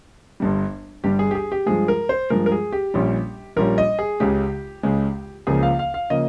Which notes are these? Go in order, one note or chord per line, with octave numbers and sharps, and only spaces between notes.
G1 G2 G3
G1 G2 G3 G4
G#4
G4
G#4
G4
G2 F3 G#3 G#4
A#4
C5
G2 F3 G#3 A#4
A#4
G#4
G4
A#1 A#2 G3 C#4
A#1 A#2 G3 C#4 A#4
D#5
G#4
C#2 C#3 G#3 G4
C#2 C#3 G#3
C#2 C#3 F3 A#3 G#4
F5
F5
F5
C#3 F3 A#3 D#5